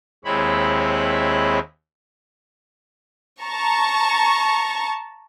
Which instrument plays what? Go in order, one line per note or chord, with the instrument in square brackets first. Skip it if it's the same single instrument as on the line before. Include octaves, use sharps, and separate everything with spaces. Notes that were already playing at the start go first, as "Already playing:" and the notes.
[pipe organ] D#2 G#3 C4 E4 C#5 B5
[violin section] A5 A#5 C#6